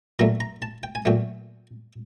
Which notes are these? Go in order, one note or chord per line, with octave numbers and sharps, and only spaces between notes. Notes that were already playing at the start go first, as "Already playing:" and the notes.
A#2 F#3 A3 A#5
A#5
A5
G5
G#5
A#2 F#3 A3 G5